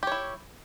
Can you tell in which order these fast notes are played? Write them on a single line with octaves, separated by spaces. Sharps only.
G4 C#5 E4